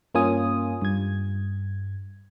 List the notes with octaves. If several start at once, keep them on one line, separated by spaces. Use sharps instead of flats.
G2 A#3 C#4 F4 G#5 D#6
G2 G#6